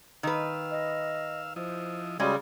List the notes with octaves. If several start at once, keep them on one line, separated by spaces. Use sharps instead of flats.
D#3 B4 F5 E6
D#5
F3 E4 C5 D#5
C#3 G3 G#3 F#4